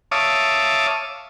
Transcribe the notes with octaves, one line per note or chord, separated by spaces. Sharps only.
C#5 E5 F5 A5 D6 D#6